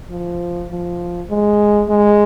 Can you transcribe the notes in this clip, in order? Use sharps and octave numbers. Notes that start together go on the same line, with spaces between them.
F3
F3
G#3
G#3